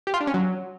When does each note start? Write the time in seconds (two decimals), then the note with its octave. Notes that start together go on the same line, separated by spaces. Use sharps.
0.07 G4
0.14 F4
0.20 D4
0.27 C#4
0.34 F#3